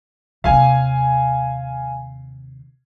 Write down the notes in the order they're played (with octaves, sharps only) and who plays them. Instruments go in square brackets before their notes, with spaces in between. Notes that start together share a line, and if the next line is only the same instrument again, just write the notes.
[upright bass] D#2 C3 [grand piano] F5 G#5